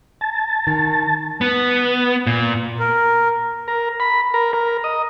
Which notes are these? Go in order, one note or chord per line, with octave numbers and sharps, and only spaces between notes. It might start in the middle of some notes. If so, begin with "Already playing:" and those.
A5
D#3
B3
A#2
A#4
A#4
B5
A#4
A#4
D#5